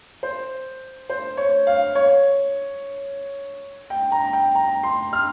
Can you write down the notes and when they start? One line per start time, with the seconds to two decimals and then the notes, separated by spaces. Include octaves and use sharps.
0.23 C5
1.10 C5
1.37 C#5
1.67 F5
1.95 C#5
3.90 G5
4.12 A#5
4.33 G5
4.55 A#5
4.83 C6
5.13 F6